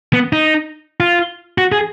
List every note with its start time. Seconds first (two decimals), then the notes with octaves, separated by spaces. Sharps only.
0.13 B3
0.33 D#4
1.00 F4
1.58 F#4
1.72 G#4